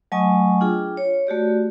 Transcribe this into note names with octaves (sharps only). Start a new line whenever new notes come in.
F#3 A3 D#5 G#5 C#6 D#6
D4 F4 G#4 G5
C#5
A3 F#4 G4 D5